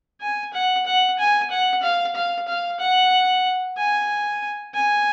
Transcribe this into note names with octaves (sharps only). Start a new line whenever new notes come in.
G#5
F#5
F#5
G#5
F#5
F5
F5
F5
F#5
G#5
G#5